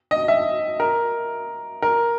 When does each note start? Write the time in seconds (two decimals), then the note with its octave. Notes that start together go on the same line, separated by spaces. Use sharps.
0.11 D#5
0.28 E5
0.80 A#4
1.82 A#4